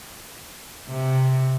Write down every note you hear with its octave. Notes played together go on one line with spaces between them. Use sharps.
C3